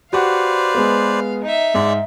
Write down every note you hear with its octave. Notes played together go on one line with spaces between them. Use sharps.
F#4 G4 B4 C5 D5 F5 F#5
G#3 B3
D#4 E5
G#2 G#3 D5